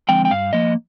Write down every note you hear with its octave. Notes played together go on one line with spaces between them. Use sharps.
D3 F3 G#3 C4 G5
G5
G2 F5
F3 A#3 D#5